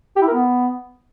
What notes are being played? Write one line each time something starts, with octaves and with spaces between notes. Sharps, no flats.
G4
E4
A#4
B3